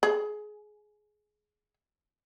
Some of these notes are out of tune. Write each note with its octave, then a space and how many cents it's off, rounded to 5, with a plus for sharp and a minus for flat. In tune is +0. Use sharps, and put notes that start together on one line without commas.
G#4 +20